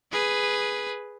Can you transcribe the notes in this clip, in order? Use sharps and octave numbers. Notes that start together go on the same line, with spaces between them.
G#4 B4